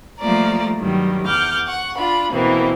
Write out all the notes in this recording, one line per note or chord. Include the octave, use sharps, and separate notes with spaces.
F3 G3 A3 A#3 D5 A#5
G2 D#3 F#3 G3
E2 F#5 D6 F6 G6
F#5 C#6
D4 F4 B5
B2 E3 A#3 C4